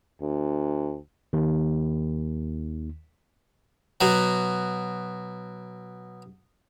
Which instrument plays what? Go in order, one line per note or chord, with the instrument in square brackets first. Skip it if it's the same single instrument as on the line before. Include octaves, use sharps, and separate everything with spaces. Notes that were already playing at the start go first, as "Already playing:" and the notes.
[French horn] D2
[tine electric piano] D#2 D#3
[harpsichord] B2 F#3